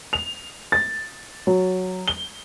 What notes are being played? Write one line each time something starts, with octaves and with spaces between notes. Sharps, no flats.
F7
A6
F#3
G7